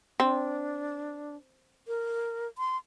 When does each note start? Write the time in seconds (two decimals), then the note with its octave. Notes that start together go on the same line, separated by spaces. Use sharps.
0.20 C4 D4
1.88 A#4
2.58 C6